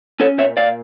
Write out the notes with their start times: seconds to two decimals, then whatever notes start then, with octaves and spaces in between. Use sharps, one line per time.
0.20 C#4 A4 C#5
0.38 A#2 C#5 E5
0.57 A#2 D5 F5